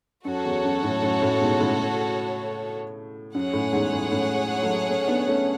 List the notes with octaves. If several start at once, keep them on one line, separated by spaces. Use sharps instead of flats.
F#2 F#4 A4 C#5
E2
F#2
F#2 A2
F#2 A2
F#2 A2
G#2 B2
A2 C#3
F#2 G#4 C#5 F#5
F#2 A2
E2 G#2
F#2 A2
F#2 A2
F#3 A3
A3 C#4
B3 D4
A3 C#4